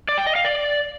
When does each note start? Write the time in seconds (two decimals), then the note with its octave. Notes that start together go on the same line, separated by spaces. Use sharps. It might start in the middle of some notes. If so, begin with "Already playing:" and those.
0.09 D5
0.18 G5
0.27 D#5
0.36 F5
0.45 D5